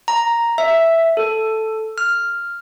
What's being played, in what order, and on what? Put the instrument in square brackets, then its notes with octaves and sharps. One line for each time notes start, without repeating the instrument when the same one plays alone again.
[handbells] A#5
E5
A4
F6